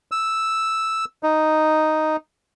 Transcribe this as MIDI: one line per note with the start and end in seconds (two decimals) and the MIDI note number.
0.12 1.05 88
1.23 2.16 63